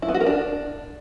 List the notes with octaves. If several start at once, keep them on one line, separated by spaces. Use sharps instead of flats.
E4
B3
F#4
A#4
D4